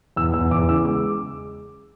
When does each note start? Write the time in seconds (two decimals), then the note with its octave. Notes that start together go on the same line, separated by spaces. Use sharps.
0.16 E2 E6
0.34 E2 E6
0.51 E2 D6
0.69 C#3 E6
0.85 G#3 D6